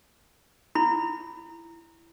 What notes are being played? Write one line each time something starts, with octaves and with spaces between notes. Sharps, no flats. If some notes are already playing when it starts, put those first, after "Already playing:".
E4 B5